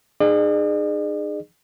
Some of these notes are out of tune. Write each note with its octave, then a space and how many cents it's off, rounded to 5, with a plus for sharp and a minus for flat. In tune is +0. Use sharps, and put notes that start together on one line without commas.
D#4 -35 G#4 +0 D5 +45